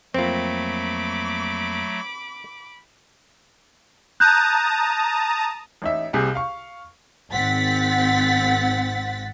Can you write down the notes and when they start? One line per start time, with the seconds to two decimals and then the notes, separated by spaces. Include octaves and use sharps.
0.14 F2 F#3 A3 A#3 C4 F4 B5 D6
4.20 A5 A#5 D#6 F#6 G6
5.82 A1 D#4 E5
6.13 C2 C3 G#4
6.35 F5 C#6
7.31 G#1 C4 F#5 A6 B6